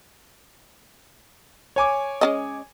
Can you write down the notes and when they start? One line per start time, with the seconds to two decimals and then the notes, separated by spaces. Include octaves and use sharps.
1.76 C#5 G#5 D6
2.21 G#3 C#4 D#5